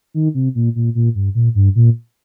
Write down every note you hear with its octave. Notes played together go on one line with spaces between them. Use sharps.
D#3
C3
A#2
A#2
A#2
G2
A#2
G2
A#2